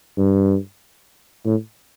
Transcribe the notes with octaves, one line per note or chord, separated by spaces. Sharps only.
G2
A2